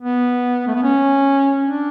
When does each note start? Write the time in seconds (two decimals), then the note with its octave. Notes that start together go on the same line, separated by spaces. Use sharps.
0.01 B3
0.68 A3
0.75 B3
0.83 C#4
1.65 D4